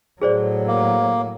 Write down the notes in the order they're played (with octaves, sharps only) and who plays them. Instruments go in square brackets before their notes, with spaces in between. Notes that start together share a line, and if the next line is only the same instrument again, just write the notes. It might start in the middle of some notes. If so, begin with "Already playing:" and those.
[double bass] A2 F#3 [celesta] G#4 C5 D5
[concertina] A#3